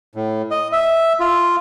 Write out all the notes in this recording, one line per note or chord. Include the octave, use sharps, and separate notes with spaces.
A2
D#5
E5
F4